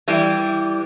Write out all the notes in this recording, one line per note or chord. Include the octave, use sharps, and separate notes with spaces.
E3 G3